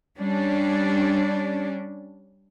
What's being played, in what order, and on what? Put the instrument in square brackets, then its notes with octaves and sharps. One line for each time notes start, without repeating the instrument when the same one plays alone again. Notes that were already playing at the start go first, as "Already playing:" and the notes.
[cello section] G3 C#4 D4